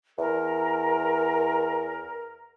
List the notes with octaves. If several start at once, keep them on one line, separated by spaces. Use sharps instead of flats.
E2 A#4